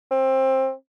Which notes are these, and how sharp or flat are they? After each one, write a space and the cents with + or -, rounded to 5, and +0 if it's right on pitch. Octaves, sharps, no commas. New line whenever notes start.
C4 +20